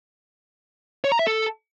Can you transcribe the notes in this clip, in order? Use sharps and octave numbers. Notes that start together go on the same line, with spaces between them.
C#5
A#5
E5
A4